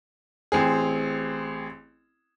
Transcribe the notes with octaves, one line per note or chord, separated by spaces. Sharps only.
A1 C4 G#4